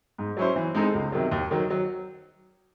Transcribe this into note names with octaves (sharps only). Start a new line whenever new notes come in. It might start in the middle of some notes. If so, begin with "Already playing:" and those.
G#2
F#3 C#4 E4 C5
E3
G#3 C4 D#4 A4
C#2
C3 D#3 F#3
D#2
D#3 F#3
F#3